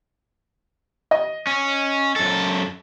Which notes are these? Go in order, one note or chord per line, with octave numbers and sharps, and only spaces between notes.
D#5
C#4
F#2 A4